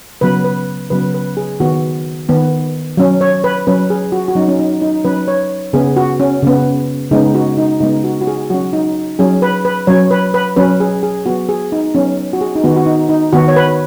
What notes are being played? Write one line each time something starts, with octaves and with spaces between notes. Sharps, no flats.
C#3 F#3 B3 B4
B4
C#3 F#3 B3 B4
B4
G#4
D#3 B3 F#4
D#3 B3
F#3 C#4
C#5
B4
F#3 C#4 B4
G#4
F#4
F#4
F#3 C#4 D#4
C#4
D#4
D#4
F#3 C#4 B4
C#5
C#3 B3 G#4
F#4
C#4
C#3 B3
C#3 G#3 B3 D#4
F#4
D#4
C#3 G#3 B3 D#4
F#4
F#4
G#4
F#3 C#4 F#4
D#4
F#3 C#4 G#4
B4
B4
F#3 C#4 C#5
B4
B4
F#3 C#4 B4
G#4
G#4
F#3 B3 F#4
G#4
D#4
F#3 B3 C#4
F#4
G#4
D#4
D#3 B3 F#4
F#4
D#4
D#4
D#3 B3 F#4
C#5
B4